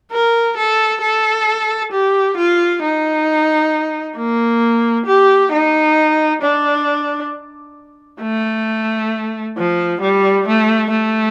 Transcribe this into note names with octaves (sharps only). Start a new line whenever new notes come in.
A#4
A4
A4
G4
F4
D#4
A#3
G4
D#4
D4
A3
F3
G3
A3
A3